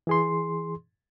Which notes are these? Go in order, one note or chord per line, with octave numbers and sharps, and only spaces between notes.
E3 G#4 C6